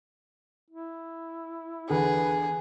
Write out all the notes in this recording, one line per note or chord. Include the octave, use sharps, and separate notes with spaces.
E4
E2 D3 G#4 B4